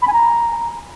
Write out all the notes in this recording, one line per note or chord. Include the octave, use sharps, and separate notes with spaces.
B5
G#5
A#5